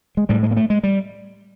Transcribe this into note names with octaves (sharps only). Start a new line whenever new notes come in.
G#3
A2 G3
G#3
A#3
A3
G#3
G3